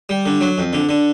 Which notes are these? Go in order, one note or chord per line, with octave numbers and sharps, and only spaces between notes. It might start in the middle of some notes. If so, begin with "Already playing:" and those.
G3
D3
F#3
F2
D3
D3